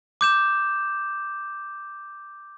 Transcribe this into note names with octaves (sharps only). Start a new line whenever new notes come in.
D6 G6 E7